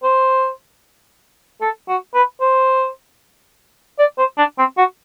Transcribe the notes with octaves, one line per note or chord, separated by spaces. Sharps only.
C5
A4
F#4
B4
C5
D5
C5
D4
C4
F#4